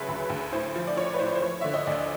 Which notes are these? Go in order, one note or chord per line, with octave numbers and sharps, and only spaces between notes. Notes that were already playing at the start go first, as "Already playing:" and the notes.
Already playing: C#2 C#3 F#3 B4 E5
D2
D2
A2 C5
F3
D5
F3 C#5
B4
A2 C5
C5
F3 C#5
D3 E5
D#5
D2 D5